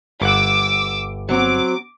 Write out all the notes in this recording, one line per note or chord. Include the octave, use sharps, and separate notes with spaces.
G1 F#5 D6 E6
F#3 C4 D6